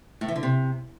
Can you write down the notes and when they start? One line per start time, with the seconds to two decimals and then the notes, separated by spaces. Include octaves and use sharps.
0.21 A2
0.28 E3
0.36 D3
0.43 C3